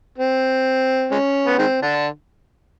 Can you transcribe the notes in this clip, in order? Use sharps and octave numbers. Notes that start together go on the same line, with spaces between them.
C4
G#3 C#4
B3
D#3 G#3 C4
D3 D4